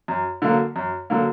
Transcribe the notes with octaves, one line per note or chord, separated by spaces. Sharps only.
F#2
D3 F#3 A#3
F#2
D3 F#3 A#3